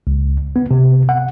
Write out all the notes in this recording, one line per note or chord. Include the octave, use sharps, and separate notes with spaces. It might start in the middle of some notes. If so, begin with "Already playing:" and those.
C#2
B3
C3
F#5